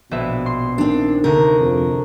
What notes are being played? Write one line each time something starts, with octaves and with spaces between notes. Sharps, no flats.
A#1 B2 B3 E5
C6
D#3 C4 D4
D2 C3 A#4
F2